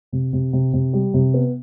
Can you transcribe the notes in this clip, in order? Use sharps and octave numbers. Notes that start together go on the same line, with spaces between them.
C3
C3
C3
C3
G3
C3
B3